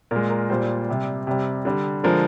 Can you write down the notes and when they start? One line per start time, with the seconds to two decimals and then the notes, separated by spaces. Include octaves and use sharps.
0.11 A#2 G#3 A#4
0.30 A#4
0.50 A#2 G3 C5
0.89 C3 G3
1.27 C3 G3
1.65 D3 G3
2.04 D3 F3 G#3 A#4